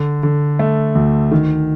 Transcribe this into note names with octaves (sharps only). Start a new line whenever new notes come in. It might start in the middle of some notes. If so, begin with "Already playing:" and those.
Already playing: D3
D3
A3
D2
D#3